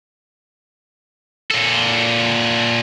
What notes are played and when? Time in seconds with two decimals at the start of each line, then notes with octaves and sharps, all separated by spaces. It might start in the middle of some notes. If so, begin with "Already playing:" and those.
1.51 A#2 A4